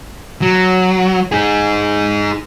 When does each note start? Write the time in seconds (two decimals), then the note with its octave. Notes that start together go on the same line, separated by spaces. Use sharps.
0.42 F#3
1.32 D#4 G#4